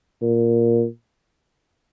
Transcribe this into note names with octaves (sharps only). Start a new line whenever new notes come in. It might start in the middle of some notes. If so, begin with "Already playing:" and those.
A#2